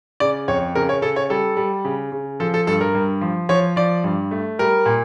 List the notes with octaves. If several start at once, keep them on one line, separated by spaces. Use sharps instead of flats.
C#3 D5
F2 C#5
C#3 A#4
C#5
C#3 A4
C#5
G3 A4
G3
C#3
C#3
F3 A4
A4
G2 A4
A#4
G2
F3
F3 C#5
F3 D5
G2
A3
G3 A#4
A#2